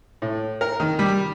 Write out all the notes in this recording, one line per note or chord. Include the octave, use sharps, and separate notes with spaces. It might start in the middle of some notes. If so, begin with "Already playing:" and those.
A2
A#4
D#3
G3